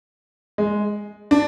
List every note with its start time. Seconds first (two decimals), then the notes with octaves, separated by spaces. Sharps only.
0.58 G#3
1.31 D4